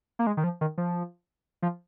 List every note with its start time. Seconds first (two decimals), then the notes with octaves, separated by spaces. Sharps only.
0.19 A#3
0.27 G#3
0.37 D#3
0.44 F3
0.61 D#3
0.78 F3
1.62 F3